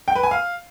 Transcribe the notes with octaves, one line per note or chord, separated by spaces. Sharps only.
G5
B4
G#5
F5